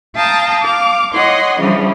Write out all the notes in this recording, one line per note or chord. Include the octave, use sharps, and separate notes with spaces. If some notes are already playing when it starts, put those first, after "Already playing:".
F5 G5 A5 A#5 D#6
F5 D6
C#5 D#5 F#5 C6
C#3 E3 F3 G3 D4